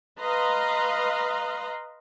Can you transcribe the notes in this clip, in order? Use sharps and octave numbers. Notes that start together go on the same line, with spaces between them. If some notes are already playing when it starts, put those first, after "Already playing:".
B4 D#5 F5 A#5 C6